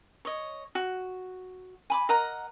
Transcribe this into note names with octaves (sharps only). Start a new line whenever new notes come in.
C#5 D#5
F#4
G#5 B5 D6
A#4 D#5 F#5 A#5